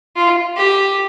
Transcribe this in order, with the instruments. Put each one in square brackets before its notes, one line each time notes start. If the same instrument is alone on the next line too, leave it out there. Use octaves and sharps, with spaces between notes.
[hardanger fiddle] F4
G4